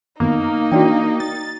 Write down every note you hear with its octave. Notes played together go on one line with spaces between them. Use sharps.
F#2 D#3 A#3 B3 D#4
E3 D4 E4 F#4 D5 G5
A6